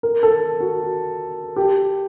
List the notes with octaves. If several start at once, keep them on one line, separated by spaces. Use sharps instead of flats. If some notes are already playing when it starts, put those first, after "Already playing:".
A#4
A4
F#4
G4